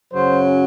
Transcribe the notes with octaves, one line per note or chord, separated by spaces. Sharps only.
F#2 C#3 F#3 C5